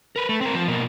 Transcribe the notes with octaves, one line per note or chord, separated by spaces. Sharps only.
A#4 B4
A3
C4 A#4
F3
B2 A#3